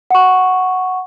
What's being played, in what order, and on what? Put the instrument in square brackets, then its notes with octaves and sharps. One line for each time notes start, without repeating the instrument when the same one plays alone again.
[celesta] F#5 C#6